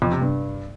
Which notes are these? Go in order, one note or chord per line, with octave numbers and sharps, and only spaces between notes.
F2
C3
G2